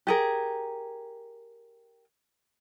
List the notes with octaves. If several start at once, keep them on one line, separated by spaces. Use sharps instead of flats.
G4 G#4 A#4